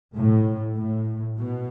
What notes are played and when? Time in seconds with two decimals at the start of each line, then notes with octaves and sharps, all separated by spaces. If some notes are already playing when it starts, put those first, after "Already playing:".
0.16 A2
0.77 A2
1.38 B2